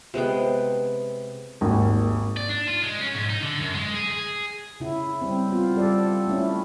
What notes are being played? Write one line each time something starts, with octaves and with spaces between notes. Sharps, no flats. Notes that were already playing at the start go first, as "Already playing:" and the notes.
C3 G#3 B3 G5
G#1 D#2
D5
D4
F4
G#3
C#4
G#2
D#4
D3
F#2
G#3
G#4
G#4
C#3 E4
G3 C4
B3 F4
G3 A4 D5
A3 C#4 E4